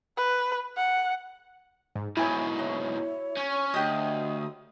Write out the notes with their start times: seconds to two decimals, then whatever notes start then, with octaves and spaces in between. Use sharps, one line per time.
0.17 B4
0.77 F#5
1.96 G#2
2.17 G#2 B2 E4 C#5 G#5 B5
2.59 F#4 C#5
3.37 C#4
3.74 D2 F#4 G4 C#5 D#5 D#6